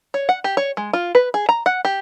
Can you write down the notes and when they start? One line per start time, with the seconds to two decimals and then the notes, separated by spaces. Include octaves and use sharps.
0.14 C#5
0.29 F#5
0.44 G4
0.57 C#5
0.77 G#3
0.93 F4
1.15 B4
1.34 G#4
1.49 A#5
1.66 F#5
1.85 G4